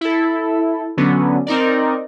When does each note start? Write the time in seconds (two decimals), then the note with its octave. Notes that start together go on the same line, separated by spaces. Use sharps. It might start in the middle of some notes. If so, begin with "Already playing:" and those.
0.01 E4 A4
0.97 D3 F#3 B3 C#4 D4
1.47 C4 D#4 A#4 D5